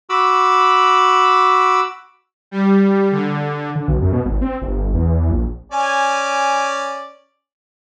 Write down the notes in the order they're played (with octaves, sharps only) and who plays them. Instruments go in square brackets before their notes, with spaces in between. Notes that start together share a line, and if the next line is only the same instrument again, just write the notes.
[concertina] F#4 B5 D6 E6
[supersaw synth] G3
D3
[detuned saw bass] D3
B1
F#2
B2
G#1
C4
G1
E2
E2
A#1
[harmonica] C#4 D5 G#5